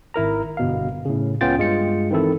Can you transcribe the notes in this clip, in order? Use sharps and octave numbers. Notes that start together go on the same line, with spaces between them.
G#1 E4 A#4 A#5
G1 B2 F5
A2 C#3
C#2 B3 C#4 F4 G5 A6
G2 G#3 F4 C#7
D#3 E3 C4 E4 A4